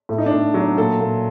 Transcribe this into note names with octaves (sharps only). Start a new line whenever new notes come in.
A2
D#4
D4
A2
F#3
D4
A#2 A4
A#2